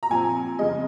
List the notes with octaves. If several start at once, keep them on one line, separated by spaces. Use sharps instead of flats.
A#5
A#2 F3 C4 G#5
F2 C#3 G#3 D#5